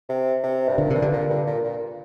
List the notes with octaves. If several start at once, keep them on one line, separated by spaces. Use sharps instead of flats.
C3
C3
G2
A#2 D3
G2 C3
D3
A#2
G2
A#2
A#2